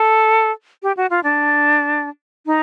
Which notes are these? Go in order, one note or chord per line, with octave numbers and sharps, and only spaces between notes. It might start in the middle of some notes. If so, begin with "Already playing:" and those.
Already playing: A4
G4
F#4
F4
D4
D#4